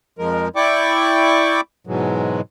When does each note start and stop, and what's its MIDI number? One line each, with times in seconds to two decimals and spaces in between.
0.19 0.48 41
0.19 0.48 53
0.19 0.48 56
0.19 0.48 70
0.56 1.61 64
0.56 1.61 74
0.56 1.61 79
0.56 1.61 85
0.56 1.61 86
1.87 2.41 44
1.87 2.41 47
1.87 2.41 52
1.87 2.41 54
1.87 2.41 56